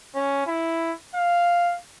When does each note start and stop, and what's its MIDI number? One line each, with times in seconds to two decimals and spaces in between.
0.15 0.44 61
0.46 0.92 64
1.15 1.76 77